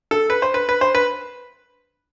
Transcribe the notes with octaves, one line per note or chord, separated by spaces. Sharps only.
A4
B4
C5
B4
B4
C5
B4